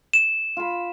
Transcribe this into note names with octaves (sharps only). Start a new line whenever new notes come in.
E7
F4 B5